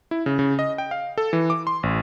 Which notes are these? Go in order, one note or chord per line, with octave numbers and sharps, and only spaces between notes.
E4
C#3
C#3
D#5
G5
F5
A4
E3
D6
C6
A1